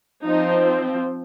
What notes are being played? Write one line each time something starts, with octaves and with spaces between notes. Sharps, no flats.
F3 C4 D#4